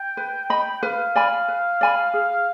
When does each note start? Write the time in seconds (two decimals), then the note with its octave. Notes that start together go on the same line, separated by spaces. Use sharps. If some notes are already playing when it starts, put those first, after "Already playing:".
Already playing: G5
0.17 B4
0.50 D#5 B5
0.82 B4 F5
1.15 D5 G#5 B5
1.48 B4
1.81 D5 G#5 B5
2.14 G#4